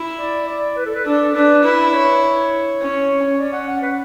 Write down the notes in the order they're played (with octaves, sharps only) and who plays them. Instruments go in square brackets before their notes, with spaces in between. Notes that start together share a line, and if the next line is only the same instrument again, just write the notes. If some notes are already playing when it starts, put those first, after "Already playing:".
Already playing: [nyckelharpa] E4
[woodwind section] D5
D5
B4
A4
B4
[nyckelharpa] D4 [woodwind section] A4
[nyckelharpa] D4 [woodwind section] B4
[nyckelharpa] E4 [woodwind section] B4
[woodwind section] B4
C#5
[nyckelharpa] C#4
[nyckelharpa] C#4 [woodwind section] D5
[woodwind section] F#5
F#5
B4